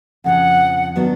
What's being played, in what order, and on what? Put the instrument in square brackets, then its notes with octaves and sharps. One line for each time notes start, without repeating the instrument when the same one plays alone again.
[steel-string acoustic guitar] F2 C#3 F3 [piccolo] F#5
[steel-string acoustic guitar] D#3 F#3 B3 D4 F#4